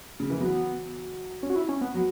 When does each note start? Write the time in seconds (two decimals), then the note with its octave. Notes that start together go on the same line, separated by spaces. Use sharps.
0.20 C#3
0.30 E3
0.40 F#3 B3
1.43 C#4
1.50 F#4
1.56 E4
1.69 C#4
1.81 B3
1.94 F#3